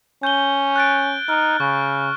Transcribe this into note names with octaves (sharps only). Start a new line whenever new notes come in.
C#4 G6 G7
F#6 A6 D7
D#4 F6
C#3 C#6